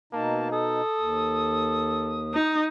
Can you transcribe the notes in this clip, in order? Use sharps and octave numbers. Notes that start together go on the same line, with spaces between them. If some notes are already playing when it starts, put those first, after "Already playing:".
B2 A#3 D#4 A5
A4 D#6
D#2
D#4